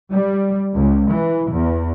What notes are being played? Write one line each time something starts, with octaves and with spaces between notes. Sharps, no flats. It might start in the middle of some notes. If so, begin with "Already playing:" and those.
G3
C#2
E3
E2